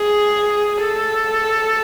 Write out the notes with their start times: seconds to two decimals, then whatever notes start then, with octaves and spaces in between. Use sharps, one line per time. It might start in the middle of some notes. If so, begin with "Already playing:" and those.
Already playing: G#4
0.78 A4